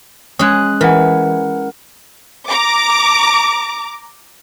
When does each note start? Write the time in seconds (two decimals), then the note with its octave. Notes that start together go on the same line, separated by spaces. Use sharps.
0.39 G#3 C#4 D#6 F#6
0.81 E3 A#4 F#5
2.49 A#5 D6